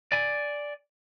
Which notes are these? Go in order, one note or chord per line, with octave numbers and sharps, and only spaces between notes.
D5 G#5